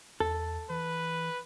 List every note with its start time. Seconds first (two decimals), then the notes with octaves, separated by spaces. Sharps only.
0.20 E2 A4
0.70 E3 B4